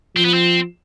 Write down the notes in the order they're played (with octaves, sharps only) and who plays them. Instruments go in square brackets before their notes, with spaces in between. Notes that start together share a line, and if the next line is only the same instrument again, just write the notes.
[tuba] F3 [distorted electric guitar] C4
[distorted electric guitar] B3
C4